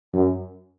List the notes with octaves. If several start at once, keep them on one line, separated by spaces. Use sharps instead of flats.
F#2